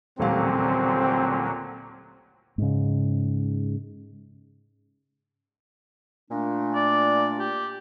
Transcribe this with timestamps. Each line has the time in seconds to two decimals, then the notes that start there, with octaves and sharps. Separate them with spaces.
0.19 D#1 A1 A#2 D3 F#3 C4 F5
2.58 G#2 C#3
6.31 A#2 A3 D4
6.75 D5
7.39 G4